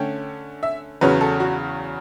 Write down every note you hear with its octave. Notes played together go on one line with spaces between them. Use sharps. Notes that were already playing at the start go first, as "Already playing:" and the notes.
Already playing: D3 A3 C#4 G5
E5
E2 C#3 F#3 C#4 B4
A4
F#4